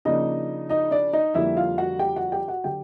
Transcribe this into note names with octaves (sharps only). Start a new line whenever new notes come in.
C#3 F3 A#3 D4 D#4 D#5
D#4 D#5
D4 D5
D#4 D#5
F2 D3 G3 A#3 E4 E5
F4 F5
F#4 F#5
G4 G5
F#4 F#5
G4 G5
F#4 F#5
D3 F#3 G4 G5